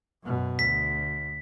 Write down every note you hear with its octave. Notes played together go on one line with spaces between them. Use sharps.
F#2 B2
D2 B6